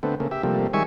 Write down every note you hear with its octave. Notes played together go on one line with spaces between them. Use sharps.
D3 A3 B3 C4
C#3 A3 A#3
G4 E5
C3 F3 G3 A3 A#3
D#3 G3 G#3 E5 G#5 C#6